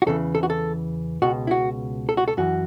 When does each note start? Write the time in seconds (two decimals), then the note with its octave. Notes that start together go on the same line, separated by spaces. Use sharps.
0.02 F#4
0.06 E2 C#3 E3 A4
0.35 A4
0.43 F#4
0.50 A4
1.22 C#2 B2 F#4
1.47 E4
1.51 F#4
2.09 A4
2.17 F#4
2.28 A4
2.37 F#2 E3 F#4